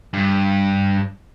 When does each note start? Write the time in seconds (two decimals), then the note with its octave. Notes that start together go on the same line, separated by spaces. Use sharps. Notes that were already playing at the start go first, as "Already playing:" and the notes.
0.14 G2